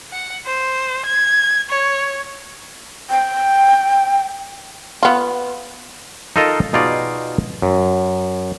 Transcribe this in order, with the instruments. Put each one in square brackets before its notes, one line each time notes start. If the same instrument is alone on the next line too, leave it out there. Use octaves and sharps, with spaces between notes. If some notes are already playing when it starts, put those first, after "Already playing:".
[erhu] F#5
C5
G#6
C#5
[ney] G5
[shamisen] B3 F4
[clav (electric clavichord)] D#4 F4 A4 A#4 D#5
B2 D#4 F4 G#4 D5
F#2